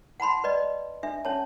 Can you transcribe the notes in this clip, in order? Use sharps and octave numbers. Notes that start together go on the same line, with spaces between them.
F#5 A5 B5 C6
B4 D5 D#5
D4 E5
C#4 C#5 A5